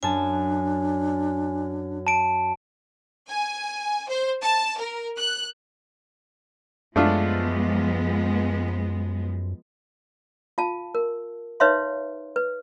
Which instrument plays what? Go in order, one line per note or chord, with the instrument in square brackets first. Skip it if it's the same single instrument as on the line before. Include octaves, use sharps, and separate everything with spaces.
[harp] F#2 A5 [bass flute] D4 [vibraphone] G#5
[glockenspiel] A5 D7
[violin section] G#5
C5
A5
A#4
F#6
[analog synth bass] F#2 [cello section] F3 G#3 B3 [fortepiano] A3 D4 F4
[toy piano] F4 F5 A5
A#4
D#4 B4 C#5 E5 F5 C6
B4